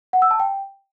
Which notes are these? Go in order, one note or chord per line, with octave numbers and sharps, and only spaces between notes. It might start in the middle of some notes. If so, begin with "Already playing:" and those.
F#5
E6
A5
G5